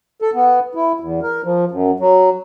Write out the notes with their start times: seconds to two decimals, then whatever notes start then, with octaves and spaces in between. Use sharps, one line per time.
0.22 A4
0.34 B3
0.75 E4
1.00 E2
1.22 A#4
1.44 F3
1.72 F#2
2.00 F#3